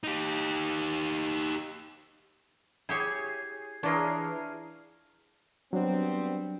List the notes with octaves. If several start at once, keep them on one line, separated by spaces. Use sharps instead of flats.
D#4 G4
E4 G4 G#4 C#5 G#5
E3 D4 F4 G#4 A#4 C#5
F#3 G3 B3 C4 D4